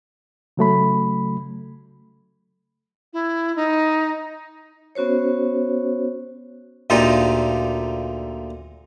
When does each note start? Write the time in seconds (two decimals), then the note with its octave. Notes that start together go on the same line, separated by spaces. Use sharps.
0.57 C#3 F#3 A3 B5
3.13 E4
3.56 D#4
4.95 B3 C#4 F#4 C5 C#5
6.90 D2 A#2 D3 D#4 F4 G4